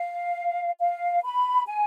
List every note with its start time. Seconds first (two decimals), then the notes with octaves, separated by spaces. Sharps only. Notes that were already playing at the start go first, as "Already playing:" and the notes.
Already playing: F5
0.80 F5
1.24 B5
1.67 G#5